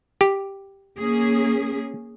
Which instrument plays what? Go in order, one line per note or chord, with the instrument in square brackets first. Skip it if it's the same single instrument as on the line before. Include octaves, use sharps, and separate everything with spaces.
[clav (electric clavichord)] G4
[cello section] A#3 C#4 G#4